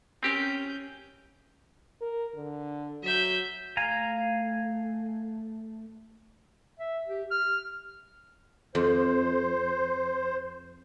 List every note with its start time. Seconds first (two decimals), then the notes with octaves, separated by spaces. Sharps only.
0.23 C4 C#4 G4 A#4 G6
2.01 A#4
2.35 D3
3.04 F#3 E5 G6
3.77 A3 F5 G#5 A#5
6.80 E5
7.07 G4
7.31 F6
8.75 F2 C5